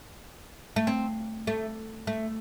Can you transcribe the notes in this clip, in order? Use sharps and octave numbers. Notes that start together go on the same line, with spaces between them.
A3
C4
A3
A3